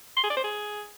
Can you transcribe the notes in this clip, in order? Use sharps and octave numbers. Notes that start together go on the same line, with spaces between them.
C6
G#4
D5
C5
G#4